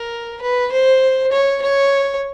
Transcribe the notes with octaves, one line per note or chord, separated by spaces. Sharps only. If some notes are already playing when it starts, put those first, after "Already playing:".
Already playing: A#4
B4
C5
C#5
C#5